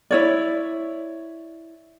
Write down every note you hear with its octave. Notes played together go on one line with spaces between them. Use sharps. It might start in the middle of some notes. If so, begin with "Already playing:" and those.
E4 C#5 D5